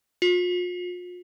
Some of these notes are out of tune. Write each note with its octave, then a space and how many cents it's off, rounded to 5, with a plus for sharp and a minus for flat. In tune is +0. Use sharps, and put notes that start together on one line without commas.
F4 +40